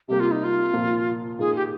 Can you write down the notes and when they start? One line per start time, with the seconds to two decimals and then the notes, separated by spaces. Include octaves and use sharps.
0.08 C3 G3 A#3 G4
0.20 F4
0.31 D#4
0.44 F4
0.73 A#2 F3 A#3
1.39 D#3 A#3 F4 G#4
1.55 G4